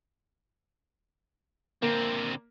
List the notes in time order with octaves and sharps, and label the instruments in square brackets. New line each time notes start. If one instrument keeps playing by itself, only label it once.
[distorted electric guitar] D3 C4 [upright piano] A#3